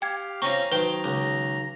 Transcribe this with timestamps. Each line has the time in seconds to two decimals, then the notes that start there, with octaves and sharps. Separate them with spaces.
0.02 G4 F5 G5 G#6
0.42 C4 C#4 F4 A#5 C#6 A#6
0.72 D#3 F#3 B4 C5 G5 A5
1.04 C#2